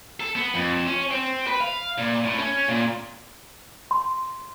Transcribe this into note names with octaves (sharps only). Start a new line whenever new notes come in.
A4
B3
F2
C#4
C4
B4
F5
A#2
A2
C#4
A#2
C6